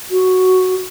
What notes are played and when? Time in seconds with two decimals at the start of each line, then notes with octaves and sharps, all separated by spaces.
0.10 F#4